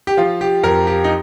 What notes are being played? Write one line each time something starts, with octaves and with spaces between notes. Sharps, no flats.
G4
F3 F4
G4
F2 A#4
G4
D#4